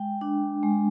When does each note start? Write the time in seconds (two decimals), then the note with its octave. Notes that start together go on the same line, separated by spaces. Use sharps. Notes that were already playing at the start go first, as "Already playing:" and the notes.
Already playing: G#3 G5
0.21 D4
0.63 G#3